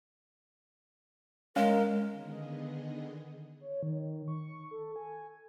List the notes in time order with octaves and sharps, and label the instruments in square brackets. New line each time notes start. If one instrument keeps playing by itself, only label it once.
[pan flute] G#3 [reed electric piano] C#4 F5 [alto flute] A#4
[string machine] D3 D#3 B3 G#4 D#5
[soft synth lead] C#5
D#3
C#6
A4
G#5